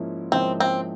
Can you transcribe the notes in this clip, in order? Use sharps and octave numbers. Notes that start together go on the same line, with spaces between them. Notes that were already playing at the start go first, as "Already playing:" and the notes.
Already playing: G#2 F3 A#3 C#4 E4
G#2 F3 A#3 C4 C#4 E4
C4